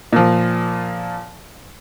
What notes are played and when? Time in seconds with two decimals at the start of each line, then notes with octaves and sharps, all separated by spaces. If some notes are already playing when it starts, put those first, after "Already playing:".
0.13 A#2 F3